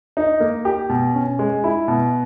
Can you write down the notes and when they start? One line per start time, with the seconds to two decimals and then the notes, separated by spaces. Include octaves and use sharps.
0.17 D#4
0.40 A#3
0.65 G4
0.89 B2
1.14 C#4
1.39 G#3
1.64 E4
1.88 B2